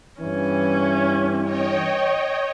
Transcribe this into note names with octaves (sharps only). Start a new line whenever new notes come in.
G2 E3 C#4
C#5 D#5 G5